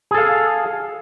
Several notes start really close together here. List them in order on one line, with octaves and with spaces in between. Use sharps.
G#4 A4 F5